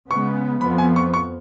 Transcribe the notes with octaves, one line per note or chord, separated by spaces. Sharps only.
C#3 G#3 B3 C#6
F2 F3 B3 B5
G#5
C#6
C#6